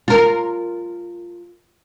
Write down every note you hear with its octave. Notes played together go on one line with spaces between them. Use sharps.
F4 A#4